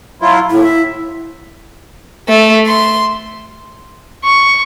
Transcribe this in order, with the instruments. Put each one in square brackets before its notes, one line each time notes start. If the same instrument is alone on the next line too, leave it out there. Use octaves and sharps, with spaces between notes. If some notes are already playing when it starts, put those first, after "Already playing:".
[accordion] F#3 E4 F4
[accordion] D#2 A2 [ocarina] E4
[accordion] E5
[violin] A3
C6
C#6